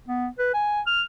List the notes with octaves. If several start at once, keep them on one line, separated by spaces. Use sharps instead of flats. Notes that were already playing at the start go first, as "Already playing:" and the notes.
B3
B4
G#5
F6